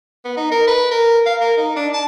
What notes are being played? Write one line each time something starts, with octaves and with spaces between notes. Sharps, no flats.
B3
D#4
A#4
B4
A#4
F5
A#4
D#4
D4
A5